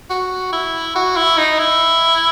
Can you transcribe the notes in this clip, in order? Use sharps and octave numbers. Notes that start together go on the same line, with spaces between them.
F#4
E4
F#4
E4
D#4
E4